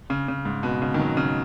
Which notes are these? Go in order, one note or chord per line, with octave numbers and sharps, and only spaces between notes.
C#3
C#3
G#2
B2
C#3
D#3
F#3
C#3